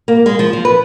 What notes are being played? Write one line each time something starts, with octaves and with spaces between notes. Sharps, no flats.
A#3
G#3
F3
F3
B4